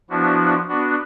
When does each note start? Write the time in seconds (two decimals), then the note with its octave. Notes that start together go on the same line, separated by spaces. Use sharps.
0.10 F3 B3 D4 E4 F#4
0.69 B3 D4 F#4